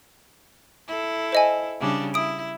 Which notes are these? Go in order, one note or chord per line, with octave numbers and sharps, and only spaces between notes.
E4 A4
C5 D#5 G#5
C#3 G3 D4
E4 D#6 D7